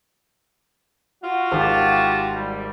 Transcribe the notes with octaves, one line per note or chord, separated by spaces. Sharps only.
F4 F#4
G#1 G4 F5 A5
G3